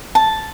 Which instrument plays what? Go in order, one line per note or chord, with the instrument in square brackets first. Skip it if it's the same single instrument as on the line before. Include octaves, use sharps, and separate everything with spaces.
[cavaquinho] A5